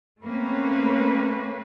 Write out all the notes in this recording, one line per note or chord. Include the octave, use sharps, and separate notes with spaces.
A3 A#3 C4 C#4 B4 C#5